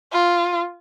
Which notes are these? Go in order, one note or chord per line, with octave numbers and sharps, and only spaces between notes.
F4